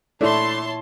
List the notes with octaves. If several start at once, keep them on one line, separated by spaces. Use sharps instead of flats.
A#2 A3 D4 E4 C#5 A5 C6